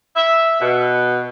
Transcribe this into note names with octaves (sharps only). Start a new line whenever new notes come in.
E5
B2